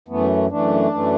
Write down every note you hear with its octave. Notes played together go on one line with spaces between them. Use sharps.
F#2 E3 A3 B3
F#2 E3 A3 D4
F#2 E3 A3